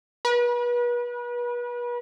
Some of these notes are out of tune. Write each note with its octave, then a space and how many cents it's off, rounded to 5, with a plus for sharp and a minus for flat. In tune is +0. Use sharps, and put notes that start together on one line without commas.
B4 -35